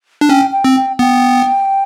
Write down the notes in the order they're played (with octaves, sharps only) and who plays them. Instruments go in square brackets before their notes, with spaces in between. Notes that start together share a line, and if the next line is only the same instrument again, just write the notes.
[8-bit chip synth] D4
[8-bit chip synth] C#4 [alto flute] G5
[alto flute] G5
[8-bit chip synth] C4
[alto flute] G5
[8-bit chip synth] B3 [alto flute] G5